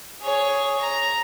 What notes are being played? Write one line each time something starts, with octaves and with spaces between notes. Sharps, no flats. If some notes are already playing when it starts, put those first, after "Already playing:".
G#4 C#5
A#5